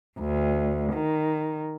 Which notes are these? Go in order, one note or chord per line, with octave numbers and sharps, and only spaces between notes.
D2
D#3